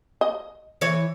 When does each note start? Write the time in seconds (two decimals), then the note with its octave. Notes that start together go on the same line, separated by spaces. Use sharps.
0.21 D#5
0.81 E3 C#5